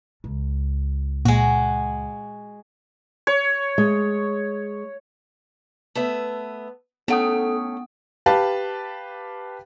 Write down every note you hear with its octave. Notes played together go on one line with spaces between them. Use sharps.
C#2
A#2 G#3 F#4
C#5
G#3
A3 B3 E5
A3 B3 C#4 A4 F#5 G5 D#6
G4 B4 F5 A5